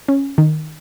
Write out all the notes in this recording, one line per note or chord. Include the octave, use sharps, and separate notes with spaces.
C#4
D#3